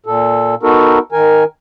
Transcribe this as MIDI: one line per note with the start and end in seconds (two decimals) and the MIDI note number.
0.06 0.55 46
0.06 0.55 69
0.63 0.99 59
0.63 0.99 63
0.63 0.99 66
0.63 0.99 69
0.63 0.99 70
1.12 1.44 51
1.12 1.44 70
1.12 1.44 80